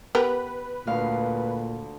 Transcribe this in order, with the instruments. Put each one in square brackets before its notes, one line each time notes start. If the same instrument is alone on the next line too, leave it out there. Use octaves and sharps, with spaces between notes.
[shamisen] B3 G4 A#4 [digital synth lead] B4
[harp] D2 F5 [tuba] A#2